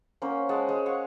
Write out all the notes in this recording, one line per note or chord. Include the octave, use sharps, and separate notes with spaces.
A#3 C#4 C5 F#5
G#3 F#5 A5
G#3
C#5 F5 F#5 C#6